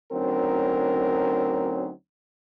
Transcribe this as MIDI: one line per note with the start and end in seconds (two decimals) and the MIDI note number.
0.12 1.90 38
0.12 1.90 54
0.12 1.90 60
0.12 1.90 61
0.12 1.90 63
0.12 1.90 70